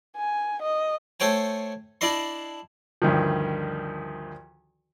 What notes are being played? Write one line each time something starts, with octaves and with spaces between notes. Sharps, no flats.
G#5
D#5
A3 A4 C5 C#5 G5 G#5
D4 E4 D5 D#5 C6
D2 G2 D#3 F3